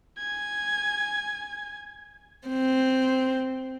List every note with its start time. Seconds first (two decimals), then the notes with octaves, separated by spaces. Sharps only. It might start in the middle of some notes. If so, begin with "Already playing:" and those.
0.17 G#5 G#6
2.48 C4